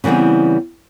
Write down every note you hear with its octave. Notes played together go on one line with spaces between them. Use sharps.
C#3 E3 G3 B3 C4